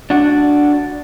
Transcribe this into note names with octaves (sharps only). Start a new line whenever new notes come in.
D4 F#4